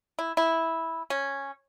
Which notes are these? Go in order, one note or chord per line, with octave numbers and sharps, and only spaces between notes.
E4
E4
C#4